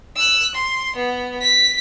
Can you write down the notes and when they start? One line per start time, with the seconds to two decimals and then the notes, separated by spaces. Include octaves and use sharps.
0.16 E6 F#6
0.55 C6
0.96 B3
1.41 B6